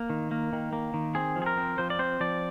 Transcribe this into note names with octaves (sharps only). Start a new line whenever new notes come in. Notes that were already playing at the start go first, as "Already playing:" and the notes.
Already playing: A#3
D#3
A#3
D#3
A#3
D#3
C4 G#4
F3
G#4
A#4
C4
F3 C5
D5
C4 C5
F3 D5